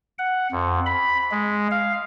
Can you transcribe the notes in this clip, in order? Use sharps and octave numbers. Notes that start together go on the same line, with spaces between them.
F#5
F2
B5
G#3
F5